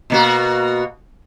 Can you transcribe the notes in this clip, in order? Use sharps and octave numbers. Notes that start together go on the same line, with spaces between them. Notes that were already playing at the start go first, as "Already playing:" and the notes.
B2 A#3 F#4